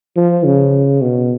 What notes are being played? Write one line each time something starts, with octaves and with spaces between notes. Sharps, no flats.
F3
C#3
B2